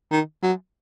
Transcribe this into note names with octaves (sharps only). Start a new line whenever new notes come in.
D#3
F#3